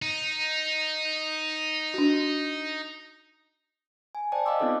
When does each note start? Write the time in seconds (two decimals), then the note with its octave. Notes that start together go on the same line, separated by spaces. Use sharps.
0.02 D#4
1.94 D4 F#4
4.15 G#5
4.32 C5 D5 G5 A5
4.45 D#5 F5 C6 D6 E6
4.60 B3 C4 D#4 F4 A4 F5